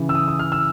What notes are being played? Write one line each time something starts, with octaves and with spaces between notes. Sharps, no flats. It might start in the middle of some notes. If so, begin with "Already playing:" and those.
Already playing: C#3 E3
E6
D#6
D#6
F6
E6